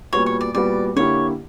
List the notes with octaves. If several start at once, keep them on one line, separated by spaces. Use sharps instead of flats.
A#2 G3 B3 F#4 C#5
C#5
D5
A#2 G3 B3 F#4 D5
D3 A#3 E4 G4 C#5